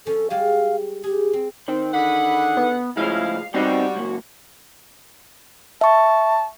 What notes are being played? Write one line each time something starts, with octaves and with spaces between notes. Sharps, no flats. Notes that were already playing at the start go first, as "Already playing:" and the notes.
F3 C#4 A4
G3 G#3 G4 F5
G4 G#4
C4
D#3 C4
D3 G#4 F#5 B5
B3
A2 C#3 F3 G#3 C#4 E4 F5
G3 B3 C4 D#4 F#4
C#2 F#2 A#3
E5 A5 C#6